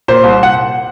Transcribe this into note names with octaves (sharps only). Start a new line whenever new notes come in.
A#2 C5
C2
F#5